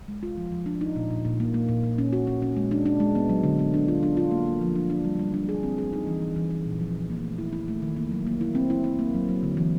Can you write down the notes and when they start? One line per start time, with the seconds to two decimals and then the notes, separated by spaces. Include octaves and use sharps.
0.08 G#3
0.23 F4
0.37 F3
0.52 F3
0.66 D4
0.81 D#4
0.96 A#2
1.10 A#2
1.25 A#2
1.40 A#3
1.54 A#3
1.69 A#2
1.84 A#2
1.98 C#4
2.13 F#4
2.27 C#4
2.42 C#4
2.57 G#3
2.71 D4
2.86 D4
3.00 G#3
3.15 B3
3.29 F#3
3.44 D3
3.59 B3
3.74 D4
3.88 F4
4.03 D4
4.17 F4
4.31 A#3
4.46 A#3
4.61 F3
4.76 D4
4.90 D4
5.05 G3
5.19 G3
5.34 D4
5.49 G#4
5.63 C4
5.78 G#4
5.93 D#4
6.07 E3
6.22 E3
6.36 E3
6.51 E3
6.66 A#2
6.80 F3
6.95 F3
7.10 A#3
7.24 A3
7.38 E4
7.53 E4
7.68 A3
7.82 D#3
7.96 A#3
8.12 F#3
8.27 A#3
8.41 E4
8.55 C4
8.70 E4
8.84 E4
8.99 A#3
9.14 F#3
9.29 F#3
9.43 D3
9.57 E3